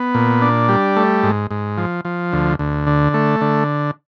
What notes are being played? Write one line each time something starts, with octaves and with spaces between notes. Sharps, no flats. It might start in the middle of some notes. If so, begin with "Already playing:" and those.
Already playing: B3
A#2
D4
G3
A3
G#2
G#2
F3
F3
D2
D2
D3
A3
D3